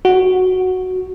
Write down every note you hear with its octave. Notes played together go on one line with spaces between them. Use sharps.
F#4